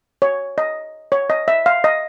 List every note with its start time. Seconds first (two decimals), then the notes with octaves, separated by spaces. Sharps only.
0.22 C#5
0.58 D#5
1.12 C#5
1.30 D#5
1.48 E5
1.66 F5
1.84 D#5